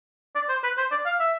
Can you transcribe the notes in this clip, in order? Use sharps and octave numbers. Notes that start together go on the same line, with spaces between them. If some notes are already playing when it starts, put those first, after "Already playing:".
D5
C5
B4
C5
D5
F5
E5